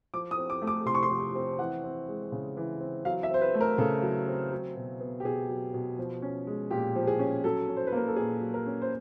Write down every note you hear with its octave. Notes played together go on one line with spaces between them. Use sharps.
F3 D6
D#6
C4
D6
A3
D6
C3 C6
C#6
C6
F3
C4
E3 F#5
C4
G#3
C#3
E3
C4
F#3 F5
E5
C4 C5
B4
A3
A#4
C#3 A4
F#3
C4
F#3
B2
B3
G4
B2 G#4
F#3
B2
F3
C#4
G#3
A#2 G4
F3
G#4
C#4
F#3 A4
C#4
C5
B4
A#3 A#4
A4
A#2 G#4
F#3
A#4
C#4
C5